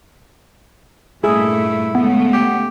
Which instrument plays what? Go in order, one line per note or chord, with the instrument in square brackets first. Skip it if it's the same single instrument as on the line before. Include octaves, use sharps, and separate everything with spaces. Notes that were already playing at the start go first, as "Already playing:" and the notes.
[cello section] G2 A#2 A3 [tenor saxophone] E4 [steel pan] G#4
[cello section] C#3 G#3 A3 [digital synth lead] B3
[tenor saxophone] G4